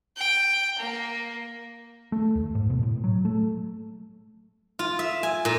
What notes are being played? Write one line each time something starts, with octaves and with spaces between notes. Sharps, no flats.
G5
A#3
A3
D#2
G#2
B2
A2
F#3
A3
F4
E5
G#5
A#2